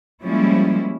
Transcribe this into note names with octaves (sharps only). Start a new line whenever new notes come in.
F3 G3 G#3 A#3 C#4 E4